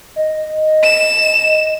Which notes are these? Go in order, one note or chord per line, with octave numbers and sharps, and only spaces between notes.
D#5
E7